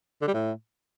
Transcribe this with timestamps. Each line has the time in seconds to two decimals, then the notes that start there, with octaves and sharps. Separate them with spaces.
0.22 D3
0.28 G3
0.34 A2